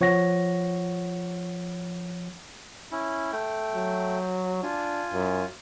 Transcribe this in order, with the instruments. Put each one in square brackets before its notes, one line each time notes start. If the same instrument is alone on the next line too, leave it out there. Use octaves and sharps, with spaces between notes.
[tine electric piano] F3 C#5 F#5 A#6
[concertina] C#4 E4
A3 G5
[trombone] F#3
[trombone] D4 [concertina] F4 G#5
[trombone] F#2